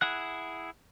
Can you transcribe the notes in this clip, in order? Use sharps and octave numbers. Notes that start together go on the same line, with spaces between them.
E4 G#4 F#5 F#6